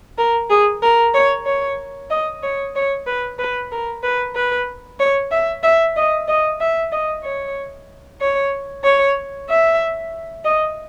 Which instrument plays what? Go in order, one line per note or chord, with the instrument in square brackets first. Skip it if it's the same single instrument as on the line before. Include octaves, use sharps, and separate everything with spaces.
[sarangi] A#4
G#4
A#4
C#5
C#5
D#5
C#5
C#5
B4
B4
A#4
B4
B4
C#5
E5
E5
D#5
D#5
E5
D#5
C#5
C#5
C#5
E5
D#5